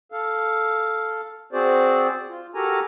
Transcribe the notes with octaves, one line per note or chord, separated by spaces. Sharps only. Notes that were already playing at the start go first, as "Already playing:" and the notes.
A4 F5
C4 F#4 G#4 C5 D5
F4
F#4 G4 A4 A#4 G#5 A#5